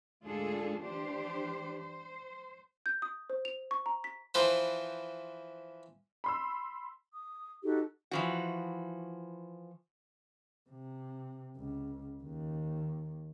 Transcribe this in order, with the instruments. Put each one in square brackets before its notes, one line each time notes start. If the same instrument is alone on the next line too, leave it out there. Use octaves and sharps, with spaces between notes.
[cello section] D2 G#2 D4 F4 G#4 A4
E3 D4 G4 C5
C5
[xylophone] G6
D#6
C5
F7
C#6
A#5
B6
[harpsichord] E3 F3 B4 C5
[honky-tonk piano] B5 C6 E6
[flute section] D#6
D#4 F#4 G4 A4
[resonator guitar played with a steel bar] E3 F3 F#4
[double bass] C3
C#2
D#2